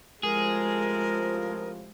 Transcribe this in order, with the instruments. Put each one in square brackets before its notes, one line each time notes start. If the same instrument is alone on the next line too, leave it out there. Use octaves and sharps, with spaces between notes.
[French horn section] A2 C3 F3 [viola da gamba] G#3 [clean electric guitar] G#4 [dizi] A#4